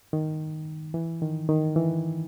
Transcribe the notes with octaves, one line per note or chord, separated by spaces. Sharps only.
D#3
E3
D#3
D#3
E3